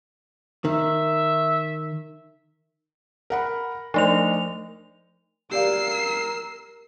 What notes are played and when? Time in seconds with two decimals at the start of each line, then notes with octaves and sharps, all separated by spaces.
0.65 D#3 E5
3.30 A#4 F#5 B5
3.94 F3 A3 D4 D#4 C5 F7
5.51 G4 A#4 D5 F5 E6 C7